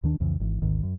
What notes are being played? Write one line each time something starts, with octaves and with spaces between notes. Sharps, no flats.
D#2 D#3 D4
C2 F2 C#3 E3
G#1 E3
G#1 D2 G#2 D#3
F#2